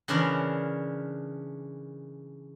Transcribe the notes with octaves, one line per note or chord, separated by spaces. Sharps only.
C#3 E3 D4 E4 A#4 C#5